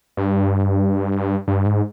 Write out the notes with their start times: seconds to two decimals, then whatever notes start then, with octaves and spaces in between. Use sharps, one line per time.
0.17 G2
1.48 G2
1.66 G#2